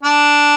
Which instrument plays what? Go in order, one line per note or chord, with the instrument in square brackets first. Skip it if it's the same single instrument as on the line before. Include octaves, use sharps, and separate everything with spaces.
[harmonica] D4